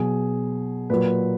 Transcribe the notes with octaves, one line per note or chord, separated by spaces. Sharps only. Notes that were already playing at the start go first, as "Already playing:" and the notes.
Already playing: B2 F#3 G#4
A#2 F#3 B4